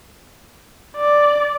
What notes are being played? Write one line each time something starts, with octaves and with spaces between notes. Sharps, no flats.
D5